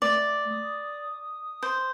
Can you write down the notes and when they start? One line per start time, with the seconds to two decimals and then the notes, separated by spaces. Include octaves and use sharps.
0.02 A3 D5
0.51 D#6
1.63 C5